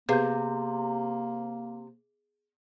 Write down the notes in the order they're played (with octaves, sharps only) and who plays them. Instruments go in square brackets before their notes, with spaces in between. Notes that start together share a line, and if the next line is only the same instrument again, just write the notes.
[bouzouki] C3 [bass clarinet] A#3 [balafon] B3 B4 F5 [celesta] G#4 G6